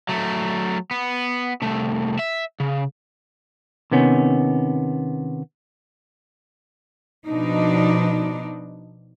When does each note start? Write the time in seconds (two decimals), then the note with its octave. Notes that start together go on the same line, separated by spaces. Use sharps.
0.09 F#3 A3
0.91 B3
1.62 C2 A3
2.19 E5
2.60 C#3
3.92 C3 D#3 B3 C#4
7.26 B2 F3 D4 D#4